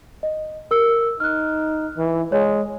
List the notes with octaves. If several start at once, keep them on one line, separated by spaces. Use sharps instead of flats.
D#5
A#4 E6
D#4 F6 F#6
E3
G#3 C#5